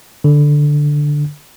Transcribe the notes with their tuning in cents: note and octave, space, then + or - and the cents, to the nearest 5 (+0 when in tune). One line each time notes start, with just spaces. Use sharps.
D3 +0